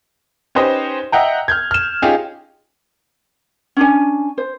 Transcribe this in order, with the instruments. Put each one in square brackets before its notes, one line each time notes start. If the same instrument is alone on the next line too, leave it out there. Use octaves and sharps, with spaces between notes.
[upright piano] C#4 D#4 G4 B4 C5 D#5
D#5 E5 F#5 G5 A#5
F6 G6 G#6
F6 E7
C#4 D#4 F4 G4 G#4
[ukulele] C#4 D4 G#5
C5